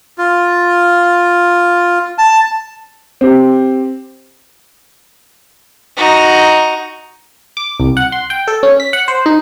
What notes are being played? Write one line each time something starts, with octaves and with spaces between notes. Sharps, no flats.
F4
A5
C4 G4
D#4 F#4
D6
C2
F#5
C6
G5
A4
C#4
B6
F#5
C5
D#4